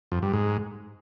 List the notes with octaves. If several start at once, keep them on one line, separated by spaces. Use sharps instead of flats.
F2
G2
G#2